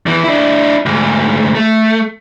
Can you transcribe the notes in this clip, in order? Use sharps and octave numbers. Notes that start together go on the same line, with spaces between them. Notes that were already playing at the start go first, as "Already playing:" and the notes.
E2 E3
D4 E4
D2 G#2
A3